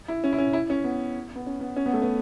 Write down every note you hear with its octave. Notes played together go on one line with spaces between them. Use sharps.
E4
C#4
E4
C#4
E4
C#4
B3
B3
C#4
B3
C#4
B3
A3
B3